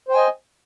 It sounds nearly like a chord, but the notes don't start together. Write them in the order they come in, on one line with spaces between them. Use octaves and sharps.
C5 G5 G#5 D#5